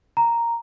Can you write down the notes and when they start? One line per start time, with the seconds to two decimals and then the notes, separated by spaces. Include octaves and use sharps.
0.17 A#5